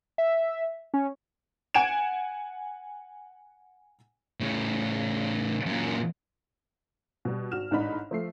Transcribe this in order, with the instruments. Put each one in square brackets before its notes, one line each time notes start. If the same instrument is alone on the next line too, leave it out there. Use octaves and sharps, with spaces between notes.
[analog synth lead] E5
C#4
[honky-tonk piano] F#5 G#5 G#6 D7 E7
[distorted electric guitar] A2 C#3
F#2 A#2
[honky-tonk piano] B2 G3
G#1 F#4 F6 E7
A1 G#2 D4 D#4 B5
F3 A3 C7